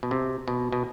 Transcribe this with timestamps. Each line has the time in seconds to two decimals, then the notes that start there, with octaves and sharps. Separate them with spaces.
0.03 B2
0.11 C3
0.48 B2
0.72 B2